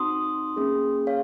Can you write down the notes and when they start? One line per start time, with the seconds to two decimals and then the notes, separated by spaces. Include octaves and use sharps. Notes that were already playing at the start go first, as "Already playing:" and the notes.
Already playing: C4 D#4 F#4 C6 D#6
0.56 A#3 C#4 G#4
1.07 C#5 F5